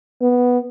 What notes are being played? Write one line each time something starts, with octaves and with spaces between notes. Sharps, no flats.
B3